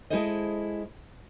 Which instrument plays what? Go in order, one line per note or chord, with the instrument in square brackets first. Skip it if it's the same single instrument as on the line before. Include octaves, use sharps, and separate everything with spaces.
[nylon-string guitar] G#3 E4 G#4 A4 C5 D#5